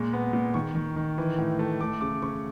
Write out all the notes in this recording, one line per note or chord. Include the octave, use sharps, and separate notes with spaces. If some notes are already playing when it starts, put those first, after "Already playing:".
Already playing: A#2 G#3 C#6
B3
A#2
D#3 C#6
D#3
D#3
E3
A2
A3
A3 D6
C#3 D6
C#3 C#6